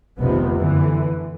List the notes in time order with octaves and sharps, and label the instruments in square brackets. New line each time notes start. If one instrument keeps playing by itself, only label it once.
[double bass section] F1 C#2 C3 D#3 F3 B3
F#2 D3 E3